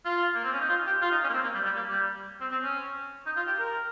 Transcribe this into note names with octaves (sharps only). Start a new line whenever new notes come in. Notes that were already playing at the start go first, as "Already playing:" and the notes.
F4
A#3
C4
C#4
D#4
F4
G4
F4
D#4
C#4
A#3
C4
A#3
G3
G3
A#3
G3
C4
C4
C#4
D#4
F4
G4
A#4